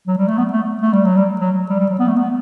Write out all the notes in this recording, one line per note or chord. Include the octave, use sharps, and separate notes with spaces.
F#3
G3
A3
B3
A3
A3
G3
F#3
G3
F#3
G3
G3
F#3
B3
A3
B3